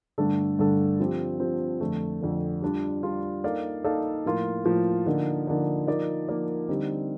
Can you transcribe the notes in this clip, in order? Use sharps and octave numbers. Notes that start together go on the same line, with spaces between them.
G2 D3 A3 D4 A4
G2 D3 A3 D4 A4
F3 C4 G4
F3 C4 G4
F2 D3 A3
F2 D3 A3
G3 D4 F4
G3 D4 F4
A#3 D#4 A4 D5 F5
A#3 D#4 A4 D5 F5
A2 F3 A#3 F4
A2 F3 A#3 F4
D3 F3 A#3 D#4
D3 F3 A#3 D#4
F3 A#3 D#4 A#4 D5
F3 A#3 D#4 A#4 D5
D3 G3 C4 D#4 G4